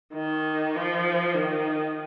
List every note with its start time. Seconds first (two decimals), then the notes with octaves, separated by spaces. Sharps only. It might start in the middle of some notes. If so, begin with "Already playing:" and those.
0.13 D#3
0.75 F3
1.35 D#3